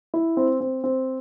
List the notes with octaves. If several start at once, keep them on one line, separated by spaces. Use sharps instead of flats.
E4
C4
C4
C4